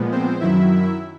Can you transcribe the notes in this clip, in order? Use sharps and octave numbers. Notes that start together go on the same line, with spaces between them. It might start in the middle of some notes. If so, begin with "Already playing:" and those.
Already playing: A#2 F3 G#3 B3
C4 C5
F#2 D#3 F#3 E4 E5